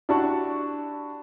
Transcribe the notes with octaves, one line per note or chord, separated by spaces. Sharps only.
D4 E4 F#4 G4 A5 C#6